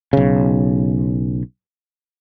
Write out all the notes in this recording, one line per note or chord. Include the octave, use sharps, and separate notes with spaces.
B1 C#3